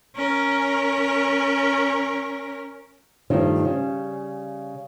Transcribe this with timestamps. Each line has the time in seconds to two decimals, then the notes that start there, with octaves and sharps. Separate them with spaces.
0.16 C#4 A#4
3.30 G2 D#3 F3 G3 A3 D#4
3.65 C#3 G3